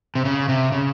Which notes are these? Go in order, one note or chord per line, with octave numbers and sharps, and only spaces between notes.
C3
C#3
C3
C#3